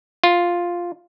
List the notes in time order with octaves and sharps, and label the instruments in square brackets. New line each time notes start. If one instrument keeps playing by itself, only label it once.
[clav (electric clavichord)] F4